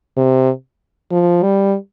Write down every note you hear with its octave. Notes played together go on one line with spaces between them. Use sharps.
C3
F3
G3